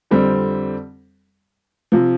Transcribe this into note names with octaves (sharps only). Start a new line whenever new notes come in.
F2 D3 G3 C4
C3 F3